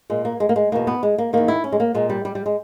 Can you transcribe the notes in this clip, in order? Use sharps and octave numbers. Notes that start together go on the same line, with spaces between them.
A#2 G#3
A#3
G#3
A#3
G#3
E2 B2 A#3
B3
G#3
A#3
E2 D#3 A#3
E4
C#4
G#3
A#3
A#2 G#3
G3
G3
G3
G#3